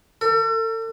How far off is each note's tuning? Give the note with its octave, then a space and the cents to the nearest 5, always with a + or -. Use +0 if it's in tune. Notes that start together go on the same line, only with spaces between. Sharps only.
A4 +40